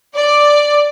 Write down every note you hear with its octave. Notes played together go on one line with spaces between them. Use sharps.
D5